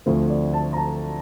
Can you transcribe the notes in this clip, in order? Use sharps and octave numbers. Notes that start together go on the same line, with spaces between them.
D2 D3 F3 A3 C4 C5
D5
A5
A#5
A5